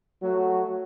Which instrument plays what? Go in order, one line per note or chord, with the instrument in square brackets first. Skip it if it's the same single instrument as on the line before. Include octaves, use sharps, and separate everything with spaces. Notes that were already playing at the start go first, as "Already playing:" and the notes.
[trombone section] F#3 A3 F#4